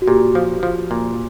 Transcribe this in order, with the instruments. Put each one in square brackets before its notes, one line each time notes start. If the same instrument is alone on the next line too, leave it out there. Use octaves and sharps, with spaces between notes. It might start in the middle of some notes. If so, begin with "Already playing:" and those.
[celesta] F#4
[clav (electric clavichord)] A#2 [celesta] G4
[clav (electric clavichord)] F3
F3
A#2